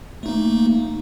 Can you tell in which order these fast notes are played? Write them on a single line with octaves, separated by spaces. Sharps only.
A3 D#4 A#3